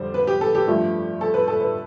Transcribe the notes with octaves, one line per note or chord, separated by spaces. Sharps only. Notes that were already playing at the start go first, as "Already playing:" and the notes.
Already playing: F2 D3 G3 C5
B4
G4
A4
G4
G2 F3 A3
A4
B4
A4
B4